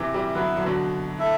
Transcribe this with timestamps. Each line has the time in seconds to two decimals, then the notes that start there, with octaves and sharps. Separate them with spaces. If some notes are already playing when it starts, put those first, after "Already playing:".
Already playing: C3 E3
0.14 E3 G3
0.35 D3 F#3 B3 E4 B4
0.56 D3 F#3
0.66 B2 D3
1.18 E4 A4 E5